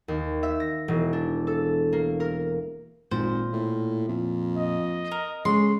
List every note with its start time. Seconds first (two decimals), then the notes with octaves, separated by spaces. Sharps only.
0.08 D#2
0.43 E5
0.60 A#6
0.88 E1
1.13 D4
1.47 A4
1.93 A#3
2.20 A#4
3.11 G#1 A#2 C5
3.53 A2
4.08 F2
4.57 D#5
5.11 A#4
5.45 C#3 G#3 C6